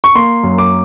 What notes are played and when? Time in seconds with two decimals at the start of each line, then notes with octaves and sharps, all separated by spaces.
0.04 C#6
0.15 A#3 C6
0.43 F#2
0.59 D6